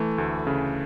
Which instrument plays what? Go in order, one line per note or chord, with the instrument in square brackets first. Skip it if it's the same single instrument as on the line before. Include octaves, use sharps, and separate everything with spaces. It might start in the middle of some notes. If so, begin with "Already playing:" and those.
Already playing: [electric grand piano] E3 A3
D2
C#3